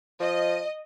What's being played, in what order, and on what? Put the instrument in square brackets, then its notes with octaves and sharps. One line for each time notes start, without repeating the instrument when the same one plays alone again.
[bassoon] F3 [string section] D#5